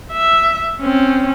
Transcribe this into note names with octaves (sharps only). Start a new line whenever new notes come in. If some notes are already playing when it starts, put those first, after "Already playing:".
E5
C4 C#4